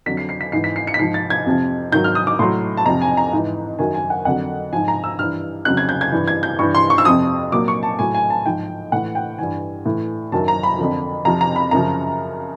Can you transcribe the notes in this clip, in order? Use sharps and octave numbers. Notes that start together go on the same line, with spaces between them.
F2 D3 F#3 B6
C7
C7
B6
G#2 E3 C7
B6
C7
C#7
B6
G#2 F3 C7
A6
G#6
F2 C3 F3
G#2 D#3 F#3 G6
F6
D#6
D6
A2 F#3 C6
A5
F2 C3 F3 A#5
G#5
A#5
G#2 E3
F#2 D#3 F#3 G#5
G#5
F#5
F2 D3 F#3 F#5
G#2 F3 G#5
A#5
E6
G2 E3 F6
F2 C#3 F#3 F#6
G#6
G6
G#6
G2 E3
G#6
G6
G2 E3 C#6
C6
C#6
E6
F2 C3 F3 D#6
A#2 F#3 D6
C#6
A5
A2 F#3 G#5
G#5
A5
G#2 F3 G5
A2 E3 F#5
G5
G2 E3 G#5
A2 E3
F#2 D#3 F#3 A5
A#5
B5
F2 D3 F3
F2 C3 F3 A#5
A#5
B5
F#2 C#3 F3 A#5